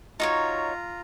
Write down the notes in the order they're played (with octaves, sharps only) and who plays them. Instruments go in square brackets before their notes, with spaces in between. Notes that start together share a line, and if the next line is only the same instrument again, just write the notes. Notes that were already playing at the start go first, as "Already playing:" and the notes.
[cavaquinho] D#4 F#4 C#5 [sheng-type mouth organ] F4 A#5